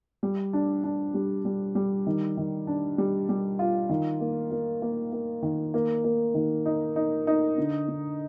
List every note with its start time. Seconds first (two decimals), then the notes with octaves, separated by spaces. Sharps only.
0.23 G3
0.53 D4
0.84 D4
1.14 G3
1.45 G3
1.75 G3
2.07 D#3
2.37 D#3
2.67 D4
2.98 G3
3.29 G3
3.59 F4
3.89 D#3
4.20 A#3
4.51 A#3
4.82 A#3
5.12 A#3
5.42 D#3
5.74 A#3
6.04 A#3
6.34 D#3
6.65 D#4
6.96 D#4
7.27 D#4
7.58 D3
7.88 D3